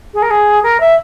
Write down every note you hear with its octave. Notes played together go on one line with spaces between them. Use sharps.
G#4
A#4
G#4
A#4
E5